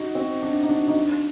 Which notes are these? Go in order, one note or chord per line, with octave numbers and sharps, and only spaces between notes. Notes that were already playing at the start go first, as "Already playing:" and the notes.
Already playing: D#4 F#4
C4
D4
D#4
D4
D#4
D4